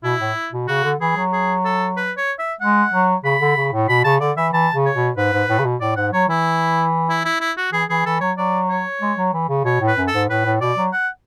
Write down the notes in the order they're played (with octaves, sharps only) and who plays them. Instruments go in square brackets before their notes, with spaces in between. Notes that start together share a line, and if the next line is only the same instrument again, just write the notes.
[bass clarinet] B2 [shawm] E4
[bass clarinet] A2
B2
[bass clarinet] C#3 [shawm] F#4
[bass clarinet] D3
[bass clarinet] E3 [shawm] G#4
[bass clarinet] F#3
[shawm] G#4
A4
B4
C#5
E5
[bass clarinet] G#3 [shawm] F#5
[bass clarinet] F#3
[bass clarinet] C#3 [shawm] B5
[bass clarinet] D3
C#3
A2
[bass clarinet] B2 [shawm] B5
[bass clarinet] C#3 [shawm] A5
[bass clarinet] D3 [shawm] D5
[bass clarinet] E3 [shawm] E5
[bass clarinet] E3 [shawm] A5
[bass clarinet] C#3
[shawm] C#5
[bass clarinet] B2
[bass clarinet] G#2 [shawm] B4
[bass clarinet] G#2
A2
C#3
B2
[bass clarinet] A2 [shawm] D5
[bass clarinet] G#2 [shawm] F#5
[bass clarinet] F#3 [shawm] C#5
[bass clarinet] E3 [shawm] E4
[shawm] E4
E4
E4
F#4
[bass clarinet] E3 [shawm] G#4
[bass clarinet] E3 [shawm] G#4
[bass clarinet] E3 [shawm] A4
[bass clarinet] F#3 [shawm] C#5
[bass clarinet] F#3 [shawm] D5
[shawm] C#5
[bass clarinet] G#3
F#3
E3
C#3
[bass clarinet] B2 [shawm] C#5
[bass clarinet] A2
[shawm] B4
[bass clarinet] F#2
[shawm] A4
[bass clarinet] G#2
[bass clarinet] A2 [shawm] B4
[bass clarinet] A2
[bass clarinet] B2 [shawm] D5
[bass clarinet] F#3
[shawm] F#5